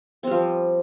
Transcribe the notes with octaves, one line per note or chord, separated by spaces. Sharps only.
F3 G3 C4